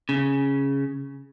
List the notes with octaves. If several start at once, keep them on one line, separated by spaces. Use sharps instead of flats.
C#3